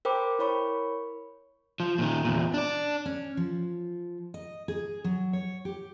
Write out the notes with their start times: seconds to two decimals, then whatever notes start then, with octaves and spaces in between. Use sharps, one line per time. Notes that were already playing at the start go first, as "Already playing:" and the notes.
0.05 A#4 C5 G5 B5 D6
0.39 E4 A#4 C#5 B5 C#6
1.80 F3
1.99 A#2 D#3
2.25 E2 A#2
2.54 D4 D5
3.06 C#4
3.37 F3
4.34 D#5
4.68 G#4
5.04 F#3
5.33 C#5
5.65 G4